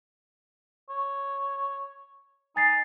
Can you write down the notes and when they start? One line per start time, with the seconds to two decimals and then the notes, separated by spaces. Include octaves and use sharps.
0.90 C#5
2.56 D#4 G#5 A6 C7